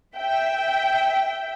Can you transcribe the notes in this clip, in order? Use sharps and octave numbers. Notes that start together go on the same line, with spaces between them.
E5 G5